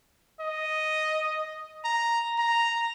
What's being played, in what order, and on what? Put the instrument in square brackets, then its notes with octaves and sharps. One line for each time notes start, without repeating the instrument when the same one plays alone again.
[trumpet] D#5
A#5
A#5